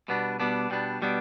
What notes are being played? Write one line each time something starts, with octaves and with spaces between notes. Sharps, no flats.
B2 G3 B3 D4
B2 G3 B3 D4
B2 G3 B3 D4
B2 G3 B3 D4